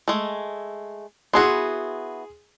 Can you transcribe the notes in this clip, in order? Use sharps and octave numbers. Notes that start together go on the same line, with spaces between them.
G#3 A3
B3 E4 F#4 G#4 C6